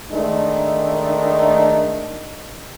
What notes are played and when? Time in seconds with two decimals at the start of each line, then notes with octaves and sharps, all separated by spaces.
0.11 D#3 G#3 A3 D4 D#4